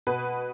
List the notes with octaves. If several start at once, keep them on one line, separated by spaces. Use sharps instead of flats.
B2 B4